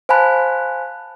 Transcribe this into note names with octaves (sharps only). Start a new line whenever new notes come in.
C5 F5 G#5 A5 B5 F#6